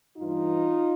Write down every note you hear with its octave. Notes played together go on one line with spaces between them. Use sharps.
G2 E3 D#4 F4